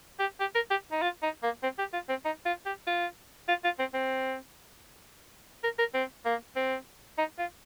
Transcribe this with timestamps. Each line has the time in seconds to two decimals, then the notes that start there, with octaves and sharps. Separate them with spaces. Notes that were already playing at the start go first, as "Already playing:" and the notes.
0.19 G4
0.40 G4
0.55 A#4
0.71 G4
0.92 D#4
1.02 F4
1.23 D#4
1.43 A#3
1.63 C4
1.79 G4
1.93 F4
2.09 C4
2.25 D#4
2.46 F4
2.66 G4
2.87 F4
3.48 F4
3.64 F4
3.79 C4
3.94 C4
5.64 A#4
5.79 A#4
5.94 C4
6.25 A#3
6.56 C4
7.18 D#4
7.39 F4